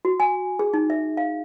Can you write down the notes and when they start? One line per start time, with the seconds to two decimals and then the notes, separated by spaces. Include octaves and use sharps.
0.05 F#4
0.20 G#5
0.59 G#4
0.74 D#4
0.90 E5
1.17 F5